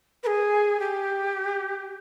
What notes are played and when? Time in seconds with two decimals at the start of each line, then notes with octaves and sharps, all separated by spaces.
0.23 B4
0.26 G#4
0.79 G4